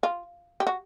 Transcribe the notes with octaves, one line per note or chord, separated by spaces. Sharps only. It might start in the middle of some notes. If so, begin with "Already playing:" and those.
F4
G4
F#4